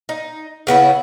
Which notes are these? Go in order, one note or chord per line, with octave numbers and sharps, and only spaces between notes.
D#4
C#3 B3 C#4 E4